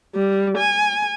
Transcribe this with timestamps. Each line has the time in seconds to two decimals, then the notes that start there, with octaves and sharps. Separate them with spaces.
0.15 G3
0.58 G#5